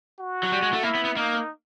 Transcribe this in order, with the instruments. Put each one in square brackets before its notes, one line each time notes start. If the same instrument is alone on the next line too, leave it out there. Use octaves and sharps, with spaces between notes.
[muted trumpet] F#4
[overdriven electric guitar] F#3
G3
G#3
A3
[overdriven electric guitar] A#3 [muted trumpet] E4
[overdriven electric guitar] B3
B3
[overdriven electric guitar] A#3 [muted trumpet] D#4